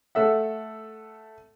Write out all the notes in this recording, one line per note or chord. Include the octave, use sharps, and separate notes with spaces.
A3 A4 E5 F#5